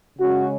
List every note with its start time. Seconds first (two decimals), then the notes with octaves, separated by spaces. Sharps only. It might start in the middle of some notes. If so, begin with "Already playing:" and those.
0.18 C#3 G#3 C#4 F#4